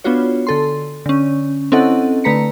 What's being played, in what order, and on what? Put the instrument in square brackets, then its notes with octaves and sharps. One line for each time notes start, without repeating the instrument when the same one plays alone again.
[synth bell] B3 D4 F4 F#4 C#5
D3 A4 C6
D3 C#4
C4 C#4 E4 A4 D#5 F#5
D3 A3 B4 A#5 B6 C#7